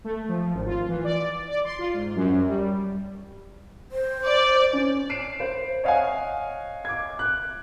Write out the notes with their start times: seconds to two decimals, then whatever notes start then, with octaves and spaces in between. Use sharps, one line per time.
0.04 A3
0.28 F3
0.54 G#1
0.66 F4
0.88 E3
1.04 D5
1.47 D5
1.65 C6
1.79 F4
1.94 G#2
2.16 F#2
2.48 G3
3.92 C5
4.25 D5
4.73 C#4
5.10 C7 D7 E7
5.40 C5
5.84 C#5 D#5 F5 F#5 G#5
6.85 D6 G#6
7.19 F#6